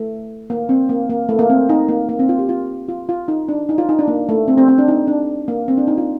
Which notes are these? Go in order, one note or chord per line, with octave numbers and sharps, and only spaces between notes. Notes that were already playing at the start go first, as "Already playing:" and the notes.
Already playing: A3
A#3
C4
A#3
A#3
A3
A#3
C4
D#4
A#3
A#3
C4
F4
G4
F4
F4
F4
D#4
D4
D#4
F4
D#4
D4
A#3
A3
C4
C4
C4
D4
D#4
D4
A#3
C4
D4
D#4
F4